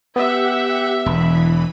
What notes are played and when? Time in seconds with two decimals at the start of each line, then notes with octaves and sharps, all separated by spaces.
0.16 B3 G4 E5 F#5
1.06 E1 E3 B5